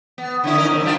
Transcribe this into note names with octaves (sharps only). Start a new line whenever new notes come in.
B3
D3 C#4 E4
C#4 D#4 A#4
D#2 C3 D#3
G3 D4 F4